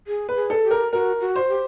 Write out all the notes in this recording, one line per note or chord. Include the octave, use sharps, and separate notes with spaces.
G#4
B4
G#4
A4
G4
A#4
F#4 A#4
F#4
C5
G4